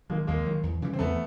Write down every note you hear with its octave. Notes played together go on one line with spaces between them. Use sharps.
D#3 F#3 G#3 A#3
D#2 G#3 A#3
D#3 F#3
E2
C#3 E3 G3
C4
E2 A3 B3